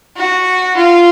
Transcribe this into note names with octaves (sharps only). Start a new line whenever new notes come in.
F#4
F4